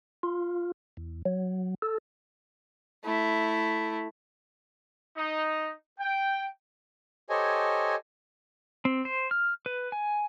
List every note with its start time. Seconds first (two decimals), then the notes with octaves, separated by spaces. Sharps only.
0.23 F4
0.97 E2
1.25 F#3
1.82 A4
3.04 A3 E4
5.17 D#4
6.00 G5
7.30 G4 A4 C5 C#5 D#5 G#5
8.85 C4
9.05 C5
9.31 F6
9.66 B4
9.92 G#5